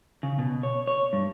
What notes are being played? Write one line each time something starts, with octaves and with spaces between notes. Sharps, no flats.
C#3
B2
C#5
C#5
G2